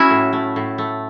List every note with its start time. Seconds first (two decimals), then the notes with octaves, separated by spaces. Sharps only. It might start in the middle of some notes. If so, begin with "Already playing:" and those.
Already playing: F#3 A3 C#4 E4 F#4
0.10 A2
0.33 A3
0.56 A2
0.78 A3